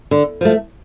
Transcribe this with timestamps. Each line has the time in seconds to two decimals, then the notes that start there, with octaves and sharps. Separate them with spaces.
0.11 D3
0.41 F3 A3